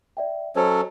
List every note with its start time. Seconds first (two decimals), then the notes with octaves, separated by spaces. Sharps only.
0.17 D5 E5 G5
0.56 F#3 C#4 A4 C5 C#5 D#5